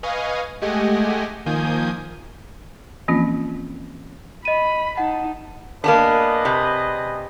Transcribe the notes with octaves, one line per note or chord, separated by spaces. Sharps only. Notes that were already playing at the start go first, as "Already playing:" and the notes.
B4 D#5 F5 G#5 C#6 D#6
G#3 A3 G4 D#5 F#5 G#5
D#3 F3 A#3 G#5 D#6 G6
E3 F3 A#3 C4 C#4 F4
D#5 B5 D#7
D#4 F#5 A5
A#3 B3 D4 G#4 B4 D#5
C3